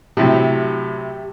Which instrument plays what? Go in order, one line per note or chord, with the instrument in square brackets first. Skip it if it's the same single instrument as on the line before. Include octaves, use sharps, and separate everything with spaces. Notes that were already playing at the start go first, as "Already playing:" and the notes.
[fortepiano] A2 C3 F#3 [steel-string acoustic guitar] G4